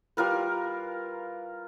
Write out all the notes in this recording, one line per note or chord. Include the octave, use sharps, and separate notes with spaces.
G3 F4 A#4 B4